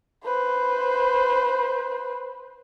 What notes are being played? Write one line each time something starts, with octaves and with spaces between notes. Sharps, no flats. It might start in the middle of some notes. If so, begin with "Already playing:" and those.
B4 C5